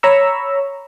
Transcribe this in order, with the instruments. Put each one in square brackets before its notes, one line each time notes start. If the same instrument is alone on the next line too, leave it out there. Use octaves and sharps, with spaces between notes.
[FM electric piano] C#5 A#5 B5 C#6 E6